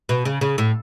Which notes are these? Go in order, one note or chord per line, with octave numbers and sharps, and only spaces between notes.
B2
C#3
C#3
A2